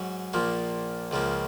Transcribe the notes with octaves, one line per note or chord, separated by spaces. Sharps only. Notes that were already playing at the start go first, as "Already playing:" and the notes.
Already playing: G#2 F#3 C#4 F#4
A#1 A#2 F3 A#3
C#2 C#3 F3 A#3